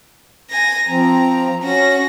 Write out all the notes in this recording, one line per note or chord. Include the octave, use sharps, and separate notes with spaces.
G#5 A#6
F3 C4 A#5
C#4 F#4 A#6